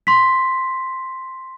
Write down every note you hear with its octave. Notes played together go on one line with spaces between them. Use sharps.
C6 B6